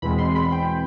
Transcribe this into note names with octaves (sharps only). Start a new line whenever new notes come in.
E2 B2 G#3 C4 B5
C6
B5
G5